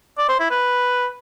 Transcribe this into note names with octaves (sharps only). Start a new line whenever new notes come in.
D5
C5
E4
B4